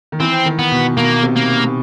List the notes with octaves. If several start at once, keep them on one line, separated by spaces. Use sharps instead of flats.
D#3
E3 C4
D#3
B3
B2
B2 A#3
C3
A#3